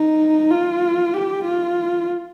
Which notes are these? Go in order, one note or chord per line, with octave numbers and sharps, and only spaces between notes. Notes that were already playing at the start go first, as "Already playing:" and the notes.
Already playing: D#4
F4
G4
F4